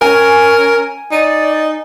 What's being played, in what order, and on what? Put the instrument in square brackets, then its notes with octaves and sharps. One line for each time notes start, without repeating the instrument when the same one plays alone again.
[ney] C#4 [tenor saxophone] A#4 [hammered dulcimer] G#5
[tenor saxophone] D#4 [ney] D5